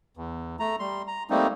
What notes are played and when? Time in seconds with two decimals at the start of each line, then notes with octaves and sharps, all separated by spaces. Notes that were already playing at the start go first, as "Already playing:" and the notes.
0.17 E2
0.60 A3 A#5
0.80 G3 C6
1.07 A#5
1.30 G3 A3 A#3 C4 D#4